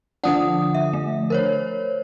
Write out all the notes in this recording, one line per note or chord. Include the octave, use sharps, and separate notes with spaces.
D3 F3 D4 F#5 D#6
E5
A3
A#4 C5 C#5